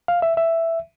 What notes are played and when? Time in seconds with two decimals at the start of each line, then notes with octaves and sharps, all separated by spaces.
0.08 F5
0.22 E5
0.37 E5